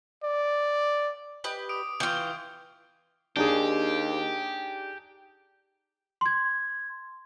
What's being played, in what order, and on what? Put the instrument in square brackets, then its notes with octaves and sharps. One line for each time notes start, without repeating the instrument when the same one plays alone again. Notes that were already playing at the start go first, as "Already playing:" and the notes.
[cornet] D5
[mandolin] G4 B4 D#5
[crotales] D6 D#6 D7
[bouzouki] E3 F4 [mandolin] G5 [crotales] C#6 G6
[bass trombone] D#2 [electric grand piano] D4 D#4 G#4 [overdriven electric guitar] G4
[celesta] C6 G#6